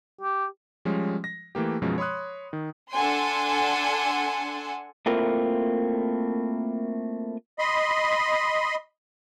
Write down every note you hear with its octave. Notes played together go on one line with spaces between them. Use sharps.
G4
F3 G3 G#3 C#4
A#6
E3 A3 A#3 G4
F#2 B2 F3 G#3 C#4
C#5 B5 C6 D#6 F#6
D#3
D4 A4 F#5 G#5 C6
A3 A#3 C4 E4 F4 A#4
D#5 B5 C6